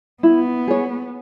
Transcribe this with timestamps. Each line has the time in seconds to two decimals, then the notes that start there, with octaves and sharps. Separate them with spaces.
0.23 B3 E4
0.68 G#4 C#5